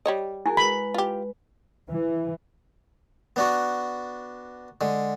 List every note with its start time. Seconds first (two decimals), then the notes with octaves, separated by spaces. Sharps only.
0.06 G3 C#5 D#5
0.46 E4 F#4 G#4 A#4 G#5
0.57 G#3 B4 B5
0.94 F4 G4
1.88 E3
3.36 B3 D4 F#4
4.81 D3 G#3